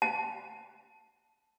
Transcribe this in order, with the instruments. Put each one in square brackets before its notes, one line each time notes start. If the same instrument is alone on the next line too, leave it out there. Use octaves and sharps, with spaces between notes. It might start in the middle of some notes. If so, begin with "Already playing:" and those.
[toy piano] A5